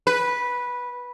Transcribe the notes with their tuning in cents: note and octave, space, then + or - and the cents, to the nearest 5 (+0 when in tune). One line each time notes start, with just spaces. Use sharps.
B4 -10